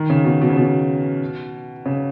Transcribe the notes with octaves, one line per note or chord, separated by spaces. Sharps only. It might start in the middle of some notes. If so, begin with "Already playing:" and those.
Already playing: D#3
C#3
B2
B2
C#3
B2
C#3